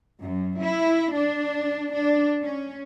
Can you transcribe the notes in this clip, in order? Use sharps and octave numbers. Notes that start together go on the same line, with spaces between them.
F#2
E4
D4
D4
C#4